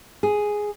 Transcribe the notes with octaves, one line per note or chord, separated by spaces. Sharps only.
G#4